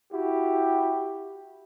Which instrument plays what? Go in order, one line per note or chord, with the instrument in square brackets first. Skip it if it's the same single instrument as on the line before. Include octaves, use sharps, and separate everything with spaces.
[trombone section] E4 F#4 G4